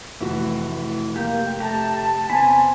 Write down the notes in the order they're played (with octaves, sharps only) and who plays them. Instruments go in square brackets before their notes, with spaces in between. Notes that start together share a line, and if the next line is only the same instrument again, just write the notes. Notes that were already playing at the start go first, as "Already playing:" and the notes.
[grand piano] F1 A2 F#4 [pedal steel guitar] E3
[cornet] A#3 [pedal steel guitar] G4 G5
[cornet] A3 [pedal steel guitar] G4 A#5 [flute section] A5
[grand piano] E2 C3 [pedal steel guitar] C5 B5 [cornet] G#5